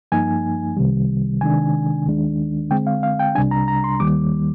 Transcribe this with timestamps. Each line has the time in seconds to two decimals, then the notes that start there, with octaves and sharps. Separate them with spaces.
0.12 G2 F3 A#3 D#4 G#5
0.77 C2 C3 D#3 G3
1.41 C3 D#3 G#3 D4 G#5
2.06 D#2 D#3 G#3 D4
2.71 D3 G#3 C4 G5
2.87 F5
3.03 F5
3.20 G5
3.35 C2 C3 G3 D4 G#5
3.51 A#5
3.68 A#5
3.84 C6
4.00 D#2 D#3 G3 A#3 D6